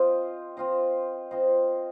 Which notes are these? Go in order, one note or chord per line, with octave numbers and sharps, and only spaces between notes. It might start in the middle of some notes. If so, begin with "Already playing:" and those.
Already playing: C4 F4 C5 D#5
C4 F4 C5 D#5
C4 F4 C5 D#5